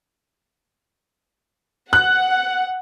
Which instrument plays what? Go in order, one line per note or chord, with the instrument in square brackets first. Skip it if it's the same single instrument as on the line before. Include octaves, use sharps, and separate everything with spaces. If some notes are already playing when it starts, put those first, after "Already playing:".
[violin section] F#5 [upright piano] F#6